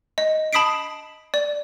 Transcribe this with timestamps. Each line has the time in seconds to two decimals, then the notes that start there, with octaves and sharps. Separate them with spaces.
0.18 D#5
0.53 A5 B5 D#6 B6 C7 D7
1.34 D5